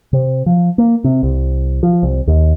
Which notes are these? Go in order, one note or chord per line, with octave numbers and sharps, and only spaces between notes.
C3
F3
A#3
C3
C2
F3
C2
D#2